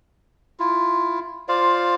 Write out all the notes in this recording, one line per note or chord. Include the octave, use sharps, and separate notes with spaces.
E4 F4
F4 C5 D5 F5